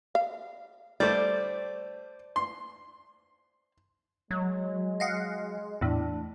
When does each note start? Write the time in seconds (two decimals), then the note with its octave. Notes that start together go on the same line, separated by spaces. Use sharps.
0.15 F5
1.00 G3 A3 C5 D5
2.36 C6
4.31 F#3 G#3
5.00 D#5 F5 F#5
5.81 E2 A2 D4